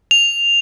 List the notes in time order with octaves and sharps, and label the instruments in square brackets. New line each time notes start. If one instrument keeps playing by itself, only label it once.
[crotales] F7